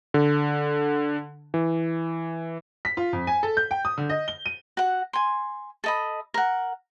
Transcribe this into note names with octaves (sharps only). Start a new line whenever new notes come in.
D3
E3
B6
F4
F2
G#5
A4
G6
G5
D#6
D3
D#5
G7
D#7
F#4 F#5
G#5 C6
A4 D#5 B5
A#4 F#5